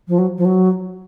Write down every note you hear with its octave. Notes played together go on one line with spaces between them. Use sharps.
F3
F#3
F3
F#3